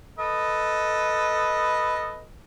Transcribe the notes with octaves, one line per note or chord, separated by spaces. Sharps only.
A4 B4 D#5